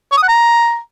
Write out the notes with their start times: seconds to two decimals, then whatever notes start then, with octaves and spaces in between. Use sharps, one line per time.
0.12 C#5
0.17 D#6
0.23 F#5
0.28 A#5